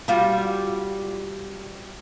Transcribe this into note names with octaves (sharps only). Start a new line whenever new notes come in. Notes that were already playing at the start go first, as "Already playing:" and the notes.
G3 F4 F#4